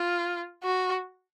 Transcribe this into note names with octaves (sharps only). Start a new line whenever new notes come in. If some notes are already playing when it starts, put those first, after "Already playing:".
Already playing: F4
F#4